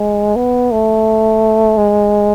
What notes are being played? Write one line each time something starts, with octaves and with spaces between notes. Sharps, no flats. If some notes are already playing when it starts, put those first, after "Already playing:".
Already playing: G#3
B3
A3
G#3